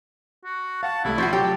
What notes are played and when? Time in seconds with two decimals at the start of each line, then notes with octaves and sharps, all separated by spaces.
0.45 F#4
0.83 F5 F#5 A5 C#6
1.04 C2 G3 A3 E4
1.18 F3 F4 F#4 C#6 G6 C7
1.33 F#3 G4 A5